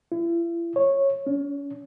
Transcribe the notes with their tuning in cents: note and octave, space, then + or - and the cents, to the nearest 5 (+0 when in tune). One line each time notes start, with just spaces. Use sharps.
E4 +40
C#5 -15
C#4 +35